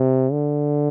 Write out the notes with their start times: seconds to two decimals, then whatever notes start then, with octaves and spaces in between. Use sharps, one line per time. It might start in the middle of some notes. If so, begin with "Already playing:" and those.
Already playing: C3
0.32 D3